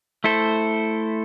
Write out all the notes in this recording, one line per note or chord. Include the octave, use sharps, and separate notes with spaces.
A3 E4 A4 C5